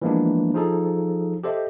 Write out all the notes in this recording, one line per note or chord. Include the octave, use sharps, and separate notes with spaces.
E3 F3 G#3 A#3 B3 D4
F3 D#4 G#4 A4
G4 A4 C5 D#5 E5